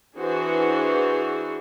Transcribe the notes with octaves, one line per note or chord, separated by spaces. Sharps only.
E3 D4 F#4 G#4 C5